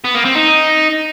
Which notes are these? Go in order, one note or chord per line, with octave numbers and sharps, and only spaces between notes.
B3
A#3
C4
D#4